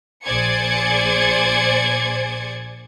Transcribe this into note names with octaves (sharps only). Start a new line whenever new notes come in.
A#1 G#4 C5 D5 G#6 C#7